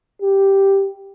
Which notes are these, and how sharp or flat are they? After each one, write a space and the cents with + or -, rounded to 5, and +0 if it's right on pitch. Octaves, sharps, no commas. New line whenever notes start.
G4 +0